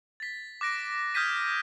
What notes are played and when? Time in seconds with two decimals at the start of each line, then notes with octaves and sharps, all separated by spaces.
0.20 A6 B6
0.61 D6 F#6 A#6 D7
1.14 D#6 F6 G6 G#6 B6 D#7